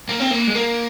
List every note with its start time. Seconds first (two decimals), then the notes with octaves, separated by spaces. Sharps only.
0.09 A#3
0.20 C4
0.31 A#3
0.47 G#3
0.55 A#3